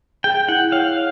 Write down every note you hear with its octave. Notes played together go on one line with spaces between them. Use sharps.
G#4 G5
E4 F#5
C#5 F5